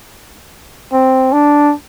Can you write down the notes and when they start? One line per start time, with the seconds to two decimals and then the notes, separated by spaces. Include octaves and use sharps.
0.92 C4
1.32 D4